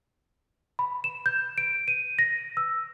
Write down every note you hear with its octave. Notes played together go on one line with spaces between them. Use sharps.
B5
E7
G6
D7
D#7
A#6
E6